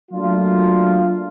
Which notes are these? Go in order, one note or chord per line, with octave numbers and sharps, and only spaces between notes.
F#3 A3 A#3 D4 F4